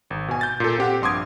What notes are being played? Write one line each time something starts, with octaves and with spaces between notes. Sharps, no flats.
G#1
B2 G#5
G6 A6
A#2 A4
C4 G4 F#5
A#1 G2 C6 D6 D#6 G#6